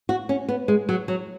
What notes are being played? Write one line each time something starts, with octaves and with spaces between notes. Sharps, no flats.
F#4
C#4
B3
G#3
F#3
F#3